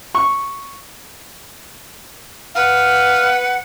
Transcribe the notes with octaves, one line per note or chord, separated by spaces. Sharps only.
C#6
B4 F5 F#5